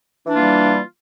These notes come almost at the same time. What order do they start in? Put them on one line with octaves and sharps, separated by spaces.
E3 D4 F4 A#3 G3